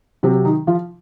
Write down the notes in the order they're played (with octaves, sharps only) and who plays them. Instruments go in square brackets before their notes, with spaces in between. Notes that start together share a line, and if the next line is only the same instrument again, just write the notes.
[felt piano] C3 F#3 C4
D#3 D#4
F3 F4